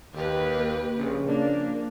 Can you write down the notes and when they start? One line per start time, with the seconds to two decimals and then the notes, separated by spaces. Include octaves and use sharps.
0.14 D#2 G4 B4
0.57 A#3
0.98 A#1 C#3
1.28 F3 A#3 D4